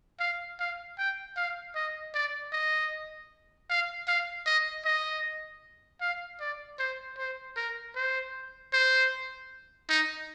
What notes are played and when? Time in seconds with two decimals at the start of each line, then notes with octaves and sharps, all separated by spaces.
0.20 F5
0.59 F5
0.98 G5
1.37 F5
1.75 D#5
2.14 D5
2.53 D#5
3.70 F5
4.08 F5
4.46 D#5
4.85 D#5
6.01 F5
6.40 D5
6.79 C5
7.18 C5
7.57 A#4
7.96 C5
8.73 C5
9.89 D#4